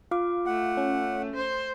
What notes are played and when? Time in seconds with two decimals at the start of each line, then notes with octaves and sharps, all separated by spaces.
0.11 F4 F5 D6
0.46 A3 F#5
0.77 C#4
1.35 C5